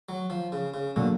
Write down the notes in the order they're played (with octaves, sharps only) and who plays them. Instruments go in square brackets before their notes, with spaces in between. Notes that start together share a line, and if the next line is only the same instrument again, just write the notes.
[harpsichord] F#3
F3
C#3
C#3
[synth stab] B2 F#3 A#3 [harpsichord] D3